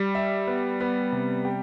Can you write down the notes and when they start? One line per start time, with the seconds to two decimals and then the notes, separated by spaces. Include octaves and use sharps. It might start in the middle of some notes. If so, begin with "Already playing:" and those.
Already playing: G3
0.15 E5
0.47 B3
0.81 B3
1.12 C3
1.45 G4